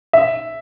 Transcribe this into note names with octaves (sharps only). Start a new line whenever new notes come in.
E5